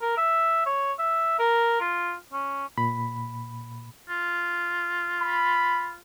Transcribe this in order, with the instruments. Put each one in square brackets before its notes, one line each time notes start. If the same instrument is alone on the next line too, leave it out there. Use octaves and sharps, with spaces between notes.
[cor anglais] A#4
E5
C#5
E5
A#4
F4
C#4
[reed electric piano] A#2 B5
[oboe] F4
[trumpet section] B5